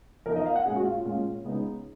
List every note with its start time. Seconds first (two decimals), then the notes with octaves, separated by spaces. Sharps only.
0.26 F3 B3 D#4 A#4
0.36 D#5
0.46 F5
0.56 F#5
0.65 A#2 G#3 C#4 G#4
0.76 F#4
0.86 F4
1.05 A#2 G#3 C#4 F4
1.44 C#3 G#3 B3 D#4